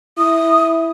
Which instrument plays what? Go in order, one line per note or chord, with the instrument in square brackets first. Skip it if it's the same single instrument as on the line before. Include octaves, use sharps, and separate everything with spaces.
[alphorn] E4 [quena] D#6